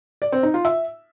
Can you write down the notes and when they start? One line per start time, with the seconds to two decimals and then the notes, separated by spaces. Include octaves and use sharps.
0.22 D5
0.32 C4
0.43 D#4
0.54 F4
0.65 E5